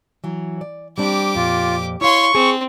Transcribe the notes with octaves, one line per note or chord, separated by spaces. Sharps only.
E3 F#3
D5
G3 C4 D4 G4 D6
F2 A#2 F4
E4 C#5 F5 C6 C#6
C4 G#4